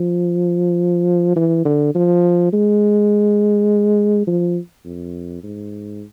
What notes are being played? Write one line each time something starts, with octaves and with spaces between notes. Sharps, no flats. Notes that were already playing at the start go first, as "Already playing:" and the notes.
Already playing: F3
E3
D3
F3
G#3
F3
F2
G#2